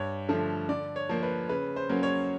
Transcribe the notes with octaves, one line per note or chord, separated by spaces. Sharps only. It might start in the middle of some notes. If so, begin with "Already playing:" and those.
Already playing: G2 C#5
D3 F3 A3
D3 D5
C#5
F3 A#3
B4
C#3 B4
C5
F#3 A#3 C#4
C#5